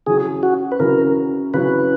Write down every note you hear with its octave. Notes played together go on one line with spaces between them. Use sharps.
C#3 F#3 C#4 E4 G#4
F#4
B4
C#3 F#3 C#4 E4 A#4
C#3 F#3 C#4 E4 B4